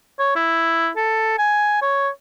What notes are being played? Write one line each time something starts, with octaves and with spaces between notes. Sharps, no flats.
C#5
E4
A4
G#5
C#5